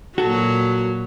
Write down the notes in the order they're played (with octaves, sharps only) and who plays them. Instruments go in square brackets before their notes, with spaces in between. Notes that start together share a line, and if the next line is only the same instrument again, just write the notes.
[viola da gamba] A#2 F#3 [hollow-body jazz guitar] F#4 A4